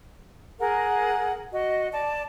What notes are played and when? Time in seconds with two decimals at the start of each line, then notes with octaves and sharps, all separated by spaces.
0.59 G#4 A#4 F#5
1.52 F#4 D#5
1.93 D5 A5